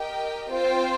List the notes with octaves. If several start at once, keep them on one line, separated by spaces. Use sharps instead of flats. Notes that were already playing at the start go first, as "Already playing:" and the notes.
Already playing: G4 A#4 D#5 G5
C4 F4 C5 G5